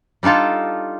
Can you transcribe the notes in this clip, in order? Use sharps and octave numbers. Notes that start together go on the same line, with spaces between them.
G3 D4 D#4 F4 A4